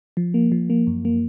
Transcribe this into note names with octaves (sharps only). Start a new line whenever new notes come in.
F3
A#3
F3
A#3
F#2
A#3